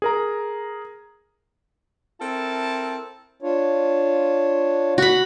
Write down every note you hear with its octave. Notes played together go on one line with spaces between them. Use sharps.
G#4 A#4 A#5
C4 E4 A4 A#4 A5
D4 F4 C#5
F#4 B5